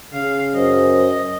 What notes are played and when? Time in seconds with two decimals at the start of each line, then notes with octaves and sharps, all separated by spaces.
0.13 C#3 F5
0.55 F#2 C5 D#5